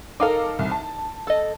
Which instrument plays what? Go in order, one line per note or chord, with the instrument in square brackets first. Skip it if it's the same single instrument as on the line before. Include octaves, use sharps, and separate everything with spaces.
[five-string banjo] D#4 A#4 [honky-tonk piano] A4 F5 D6
[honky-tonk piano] C2
A5
[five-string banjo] A4 D#5